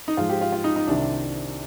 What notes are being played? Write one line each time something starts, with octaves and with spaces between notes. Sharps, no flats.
D#4
G#2 F3 G#3 F4
G4
F4
F4
D#4
D#4
C2 C3 D#3 D4